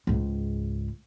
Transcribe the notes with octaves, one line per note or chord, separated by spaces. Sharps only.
C#2 G#2